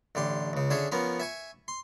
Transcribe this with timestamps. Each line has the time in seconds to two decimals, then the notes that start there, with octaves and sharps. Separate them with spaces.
0.15 A1 D3 G4 C6
0.53 C#2 C#3
0.70 D3 C#4 G#4 E5
0.92 F3 B3 C#4 A#4
1.20 E5 G#5 C#6
1.68 C6